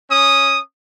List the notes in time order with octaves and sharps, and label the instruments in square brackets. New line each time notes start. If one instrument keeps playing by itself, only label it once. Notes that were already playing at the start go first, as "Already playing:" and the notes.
[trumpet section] C#4 D#6